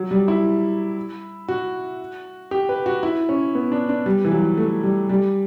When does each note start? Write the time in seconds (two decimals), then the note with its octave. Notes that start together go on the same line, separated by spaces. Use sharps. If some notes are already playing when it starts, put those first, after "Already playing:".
Already playing: F#3
0.11 G3
0.28 E4
1.48 F#4
2.51 G4
2.69 B4
2.86 F#4
3.03 E4
3.29 C#4
3.55 B3
3.72 D4
3.89 D4
4.06 G3
4.25 E3
4.32 F#3
4.58 A3
4.84 G3
5.09 G3